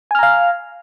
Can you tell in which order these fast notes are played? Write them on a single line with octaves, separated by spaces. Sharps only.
G#5 F6 A#5 F5